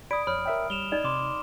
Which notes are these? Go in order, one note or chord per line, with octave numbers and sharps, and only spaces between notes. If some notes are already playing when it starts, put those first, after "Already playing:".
D5 B5 D#6 D7
F2 C#5 B5 F6
A#4 E5 G5
G3 E7 F7 G7
D#4 D5 D#5
C3 C6 D6 E7